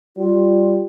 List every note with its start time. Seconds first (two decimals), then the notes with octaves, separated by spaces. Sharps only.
0.17 G3 F4